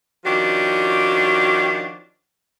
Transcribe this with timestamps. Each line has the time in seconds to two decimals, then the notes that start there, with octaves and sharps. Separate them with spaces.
0.25 D#3 F3 C#4 D4 F#4 G4